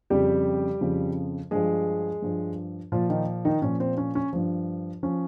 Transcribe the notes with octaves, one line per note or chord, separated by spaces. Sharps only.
F2 C#3 F3 G3 G4
F2 C#3 F3
G2 F3 G#3 G#4
G2 F3
A#2 F3 F4
D#3 D#4
D#3 D#4
A#2 F3 C#4
C4
C#4
C#4
G2 F3
F3 C#4